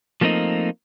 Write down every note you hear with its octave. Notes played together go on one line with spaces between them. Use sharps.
F3 A3 A#3 C4 D#4